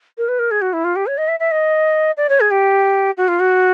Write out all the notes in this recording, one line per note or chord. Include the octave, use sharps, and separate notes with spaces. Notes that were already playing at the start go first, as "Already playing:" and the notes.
A#4
B4
A#4
G#4
F#4
E4
F4
G4
C#5
D#5
E5
E5
D#5
D5
C#5
G#4
G4
F#4
F4
F#4